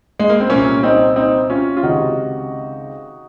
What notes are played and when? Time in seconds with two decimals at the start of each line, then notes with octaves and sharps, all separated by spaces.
0.20 G#3
0.30 A#3
0.40 C4
0.50 C2 A#2 A#3 C#4
0.83 C4 D#4
1.16 C4 D#4
1.50 C#4 F4
1.77 F4
1.83 C#2 C3 D#3 D#4 F#4